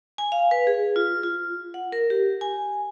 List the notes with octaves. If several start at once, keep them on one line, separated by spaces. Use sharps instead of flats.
G#5
F5
B4
G#4
F4
F4
F#5
A#4
G4
G#5